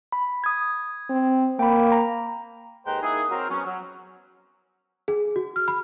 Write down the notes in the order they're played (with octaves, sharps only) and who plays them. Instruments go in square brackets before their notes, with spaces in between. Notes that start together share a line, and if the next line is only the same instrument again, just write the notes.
[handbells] B5
D#6 G#6
[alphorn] C4
[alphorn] A#3 [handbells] G5 B5
[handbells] A#5
[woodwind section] D#2 G#3 B4 C5 G5 A#5
A#3 D#4 E4 G#4
F#3 C4 A#4
F#3 B3 C#4
F#3
[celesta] G#4
F#4
F6
B5